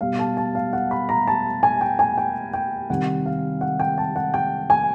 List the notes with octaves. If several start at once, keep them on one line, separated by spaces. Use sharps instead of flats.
B2 G3 F5
A5
A5
F5
F#5
B5
A#5
A5
G#5
G5
G#5
G5
G5
C3 D#3 G3 F#5
F5
F#5
G5
A5
F#5
G5
G#5